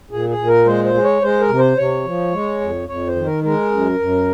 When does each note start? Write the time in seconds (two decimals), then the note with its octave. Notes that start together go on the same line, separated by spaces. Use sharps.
0.11 A#2 G#4
0.29 G#4
0.38 A#2
0.47 A#4
0.66 G#3 C5
0.84 C5
0.94 G#3
1.04 C#5
1.22 G#3 C5
1.41 A#4
1.49 C3
1.58 C5
1.77 C3 C#5
2.05 F3
2.33 G#3
2.61 F2
2.88 F2 C#5
3.07 C5
3.16 D#3
3.26 A#4
3.44 G#3 A#4
3.71 F#2
3.99 F#2